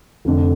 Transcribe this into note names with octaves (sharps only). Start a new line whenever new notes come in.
F1 F2 D3